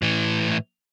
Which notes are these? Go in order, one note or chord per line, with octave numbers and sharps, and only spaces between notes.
A2 E3